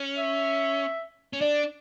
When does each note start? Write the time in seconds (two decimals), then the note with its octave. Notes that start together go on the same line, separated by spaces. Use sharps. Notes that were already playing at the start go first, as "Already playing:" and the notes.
Already playing: C#4
0.17 E5
1.33 C#4
1.41 D4 D5